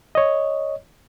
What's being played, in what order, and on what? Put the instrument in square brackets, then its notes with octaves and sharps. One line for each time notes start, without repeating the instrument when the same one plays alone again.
[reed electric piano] C#5 D#5